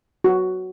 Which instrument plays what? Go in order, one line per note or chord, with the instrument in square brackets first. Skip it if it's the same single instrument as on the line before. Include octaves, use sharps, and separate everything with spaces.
[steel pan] F#4